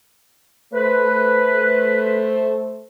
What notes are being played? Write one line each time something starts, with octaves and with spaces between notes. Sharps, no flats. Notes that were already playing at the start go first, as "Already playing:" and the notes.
A3 B4 C5